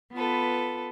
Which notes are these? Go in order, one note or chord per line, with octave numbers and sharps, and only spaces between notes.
B3 F4 A4 B4